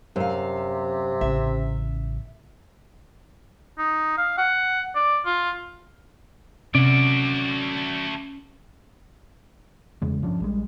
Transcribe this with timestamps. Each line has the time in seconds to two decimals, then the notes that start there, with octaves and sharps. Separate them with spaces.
0.16 F#2 C3 F5
1.21 A1 C#3 E5
3.78 D#4
4.18 F5
4.38 F#5
4.95 D5
5.25 F4
6.75 C3 F#3 A3 C#4 F#4 D5
10.02 E2 C#3 G#3
10.22 G1 F3 C#4 D4
10.40 A#1 G3 G#3